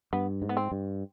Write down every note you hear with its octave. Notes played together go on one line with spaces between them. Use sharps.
G2 B3
G#2
B3
C4
G2